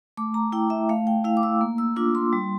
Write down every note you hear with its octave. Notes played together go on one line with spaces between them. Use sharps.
A3 D6
A#5
E4 G5
E5
A3 F5
G5
E4 F5
D6
E6
A#3
E6
D4 F4 D6
C6
G3